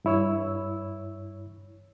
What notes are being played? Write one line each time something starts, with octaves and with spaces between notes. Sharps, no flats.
G2 E4 C#5 E6